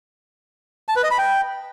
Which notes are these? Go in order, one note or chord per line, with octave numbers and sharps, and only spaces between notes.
A5
B4
D#5
B5
G5